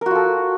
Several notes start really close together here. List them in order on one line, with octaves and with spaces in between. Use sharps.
A#4 F#4 F4 A4